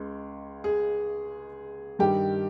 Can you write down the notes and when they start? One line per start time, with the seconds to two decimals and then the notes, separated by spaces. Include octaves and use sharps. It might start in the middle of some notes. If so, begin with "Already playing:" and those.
Already playing: C#2 C#3 G#3
0.64 G#4
1.99 G2 D#3 G3 G4